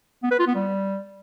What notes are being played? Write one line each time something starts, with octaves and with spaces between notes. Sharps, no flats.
B3
B4
F4
B3
G3